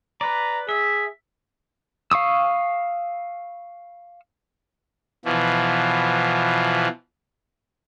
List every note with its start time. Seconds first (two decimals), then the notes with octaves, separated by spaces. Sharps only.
0.21 B4 D5 A#5
0.69 G#4 E5
2.11 F5 C#6 D#6 E6
5.25 B2 E3 F3